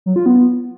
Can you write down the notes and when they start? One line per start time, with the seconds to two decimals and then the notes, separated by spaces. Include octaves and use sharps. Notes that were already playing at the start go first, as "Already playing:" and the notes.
0.06 F#3
0.16 F4
0.26 B3